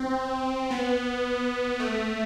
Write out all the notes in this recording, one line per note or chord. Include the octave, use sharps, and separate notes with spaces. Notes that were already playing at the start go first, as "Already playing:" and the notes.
Already playing: C4
B3
A3